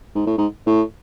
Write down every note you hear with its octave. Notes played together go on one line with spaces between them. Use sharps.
G#2
A2
G#2
A2